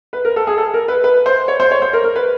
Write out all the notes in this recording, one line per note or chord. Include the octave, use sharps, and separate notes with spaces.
B4
A#4
A4
G#4
A4
A#4
B4
B4
C5
C#5
C5
C#5
C5
A#4
A#4
B4